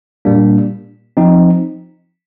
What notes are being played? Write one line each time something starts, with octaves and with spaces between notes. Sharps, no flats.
A#2 G3 A#3 D4
F3 C4 D#4